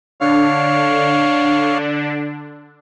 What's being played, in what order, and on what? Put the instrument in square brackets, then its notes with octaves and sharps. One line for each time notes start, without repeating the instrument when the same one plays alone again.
[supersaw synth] D3 D4 [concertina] C#5 F5